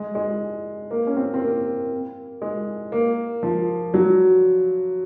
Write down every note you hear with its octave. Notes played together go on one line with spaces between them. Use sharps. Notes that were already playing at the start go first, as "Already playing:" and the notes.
Already playing: G#3
G#3
A#3
C#4
C4
C4
A#3
G#3
A#3
F3
F#3